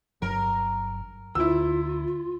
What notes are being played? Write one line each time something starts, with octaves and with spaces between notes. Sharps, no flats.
G1 G2 F#3 A#4
D2 E4 F4 E6